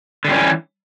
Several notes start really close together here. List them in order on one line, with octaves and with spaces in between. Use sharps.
D3 G3 C#4 E3